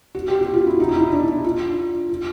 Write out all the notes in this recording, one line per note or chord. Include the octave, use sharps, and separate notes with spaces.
F#4
G4
F#4
F4
E4
D#4
E4
D#4
D4
D#4
F4
F4